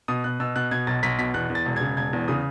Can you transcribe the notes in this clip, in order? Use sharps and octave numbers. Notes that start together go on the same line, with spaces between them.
B2 D#6
B2 F#6
B2 E6
B2 F#6
B2 G#6
B1 A6
B1 B6
B2 B6
E2 F#6
E2
A6
E1
C#3 G#6
E1 G#6
E2
C#3 D#6